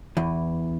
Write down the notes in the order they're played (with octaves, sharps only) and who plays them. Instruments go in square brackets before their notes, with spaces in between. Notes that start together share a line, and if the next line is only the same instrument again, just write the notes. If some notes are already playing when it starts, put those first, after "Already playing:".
[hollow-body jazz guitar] E2 E3